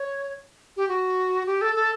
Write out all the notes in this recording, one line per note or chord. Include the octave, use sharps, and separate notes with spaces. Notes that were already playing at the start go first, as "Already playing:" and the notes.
Already playing: C#5
G4
F#4
G4
A4
A4